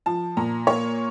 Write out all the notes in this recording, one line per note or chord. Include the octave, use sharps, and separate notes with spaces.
F3 A5
A#2 A#5
A#3 C#5